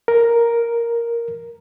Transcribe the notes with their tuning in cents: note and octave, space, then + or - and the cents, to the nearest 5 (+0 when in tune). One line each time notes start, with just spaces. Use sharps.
A#4 +0